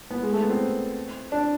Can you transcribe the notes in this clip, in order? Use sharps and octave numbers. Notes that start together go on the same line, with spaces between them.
B3
G#3
A3
B3
C4
D4